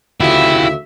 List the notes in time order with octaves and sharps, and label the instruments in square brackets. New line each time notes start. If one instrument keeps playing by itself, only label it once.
[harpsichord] D2 C#3 [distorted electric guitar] E4 [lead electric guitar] F4 G4 [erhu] E5